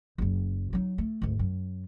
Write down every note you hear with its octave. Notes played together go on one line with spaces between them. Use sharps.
F#1 F#2
F#3 D#4
A3
G#1 D2
F#2